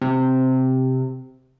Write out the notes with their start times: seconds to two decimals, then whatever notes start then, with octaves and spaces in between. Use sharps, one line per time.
0.01 C3